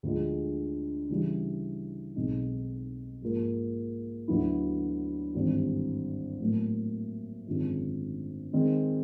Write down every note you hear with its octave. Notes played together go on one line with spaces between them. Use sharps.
D2 D3 F3 G#3
C#3 E3 G3
B1 B2 G#3 C4 D#4
G#2 F3 A#3
D2 D3 F#3 B3 E4
G#1 G2 E3 G3
A2 F#3 A#3
G#1 F#2 D3 F3 G#3
D#3 G#3 C4